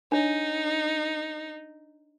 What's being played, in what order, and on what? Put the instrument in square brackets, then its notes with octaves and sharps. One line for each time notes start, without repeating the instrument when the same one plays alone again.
[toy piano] D4 C#5 [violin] D#4